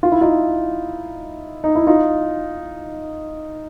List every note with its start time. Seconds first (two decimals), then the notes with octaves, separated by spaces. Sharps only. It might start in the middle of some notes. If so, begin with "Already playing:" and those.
0.03 F4
0.12 E4
0.21 D#4 F4
1.64 D#4
1.75 E4
1.87 D#4 F4